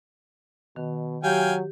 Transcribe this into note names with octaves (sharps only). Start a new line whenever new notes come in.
B2 D#3
F#3 G4 F5 G5 G#5 G6